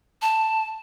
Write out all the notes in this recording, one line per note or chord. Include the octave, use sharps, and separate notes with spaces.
A5